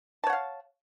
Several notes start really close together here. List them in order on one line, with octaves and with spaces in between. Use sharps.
A5 C#5 F#5 F5